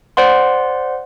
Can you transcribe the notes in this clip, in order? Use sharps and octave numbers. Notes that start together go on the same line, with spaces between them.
C5 D5 F#5 C6